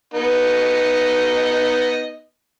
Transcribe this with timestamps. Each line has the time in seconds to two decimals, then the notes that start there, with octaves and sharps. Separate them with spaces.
0.14 B3 D#4 D#5